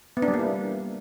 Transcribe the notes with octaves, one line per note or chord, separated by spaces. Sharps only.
B3
D4
G3
A#3
E4